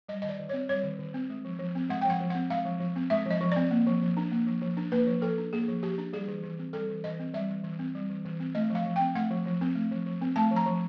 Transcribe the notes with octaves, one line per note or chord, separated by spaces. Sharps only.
G3 D#5
D#3 D#5
D5
D#3
C4 C#5
G3 C#5
D#3
D#3
C4
G#3
F3
F3
C4
G#3 F#5
F3 G5
F#5
F3
C4 F#5
G#3 F5
F3
F3
C4
G#3 E5
F3 D#5
F3
C4 D5
A#3
F3
F3
D4
A#3
F3
F3
D4
A#3 B4
F3
F3 A4
D4
A#3 G#4
F3
F3 G4
D4
G3 G#4
E3
E3
C4
G3 A4
E3
E3 D#5
C4
G3 E5
E3
E3
C4
G3
E3
E3
C4
A3 D#5
F3
F5
F3
C4 G5
A3 F#5
F3
F3
C4
A3
F3
F3
C4
A3 A5
F3
A#5
F3